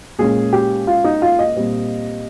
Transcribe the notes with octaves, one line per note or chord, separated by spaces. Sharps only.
A#2 G#3 C#4 G#4
G4
F4
D#4
F4
D#5
A#2 G3 C4